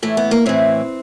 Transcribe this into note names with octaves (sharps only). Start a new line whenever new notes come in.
A2 E3 A3
B3
A#3
A2 E3 C4